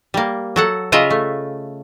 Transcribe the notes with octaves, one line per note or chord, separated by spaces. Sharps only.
G3 A#3
F#3 A4 F#5
C#3 F4 D#5 E5 A#5
A3